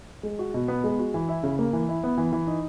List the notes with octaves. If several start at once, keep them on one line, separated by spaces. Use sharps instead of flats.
G#3
F#4
B2
B3
G#3
F#4
E3
E4
C#3
A#3
E3
E4
B3
E3
E3
D#4